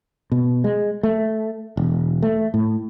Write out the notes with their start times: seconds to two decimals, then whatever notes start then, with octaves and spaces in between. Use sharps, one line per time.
0.32 B2
0.64 G#3
1.03 A3
1.77 E1
2.23 A3
2.54 A2